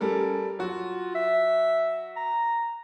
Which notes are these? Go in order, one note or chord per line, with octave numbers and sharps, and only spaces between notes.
G3 C#4 A4 A#4
F#3 F4 F#4
E5
A#5